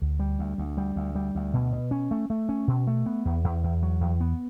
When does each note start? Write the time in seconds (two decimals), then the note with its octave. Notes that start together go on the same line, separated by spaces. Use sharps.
0.02 D2
0.20 G3
0.39 D2
0.58 D2
0.77 G3
0.96 D2
1.15 G3
1.35 D2
1.54 B2
1.72 B2
1.91 C#4
2.11 A3
2.30 A3
2.49 C#4
2.68 B2
2.87 A3
3.06 B3
3.25 E2
3.44 E2
3.64 E2
3.83 F#3
4.01 E2
4.21 B3